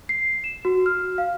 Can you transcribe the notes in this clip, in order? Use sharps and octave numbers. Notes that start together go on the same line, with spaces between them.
C7
E7
F#4
F6
F5